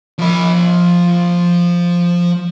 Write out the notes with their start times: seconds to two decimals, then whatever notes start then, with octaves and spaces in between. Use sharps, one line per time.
0.18 F3 B5